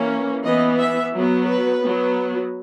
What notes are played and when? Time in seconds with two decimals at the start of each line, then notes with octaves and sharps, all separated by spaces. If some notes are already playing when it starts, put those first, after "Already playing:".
Already playing: E3 A#3 C#4
0.45 E3 B3 D#5
0.79 E5
1.12 F#3 B3
1.47 B4
1.81 F#3 B3